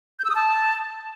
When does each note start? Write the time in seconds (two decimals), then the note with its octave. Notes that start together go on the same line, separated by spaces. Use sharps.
0.19 G6
0.25 E6
0.30 D#6
0.35 A5